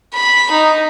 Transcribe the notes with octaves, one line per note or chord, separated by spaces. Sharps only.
B5
D#4